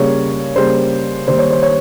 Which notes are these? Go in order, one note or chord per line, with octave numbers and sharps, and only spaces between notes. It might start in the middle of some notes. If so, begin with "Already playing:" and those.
Already playing: C#3 G3 A#3 C#5
C#3 G3 A#3 C5
D#3 G3 A#3 C5
C#5
C5
C#5